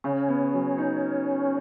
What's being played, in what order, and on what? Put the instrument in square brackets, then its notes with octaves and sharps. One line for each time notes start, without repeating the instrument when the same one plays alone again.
[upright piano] C#3 [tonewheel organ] C#4
[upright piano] B3
F#3
D#4